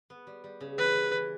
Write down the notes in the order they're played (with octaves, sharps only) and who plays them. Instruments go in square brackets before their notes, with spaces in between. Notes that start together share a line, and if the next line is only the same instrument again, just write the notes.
[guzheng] B3
G3
G3
C#3
[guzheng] E3 [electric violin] B4
[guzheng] E3
E3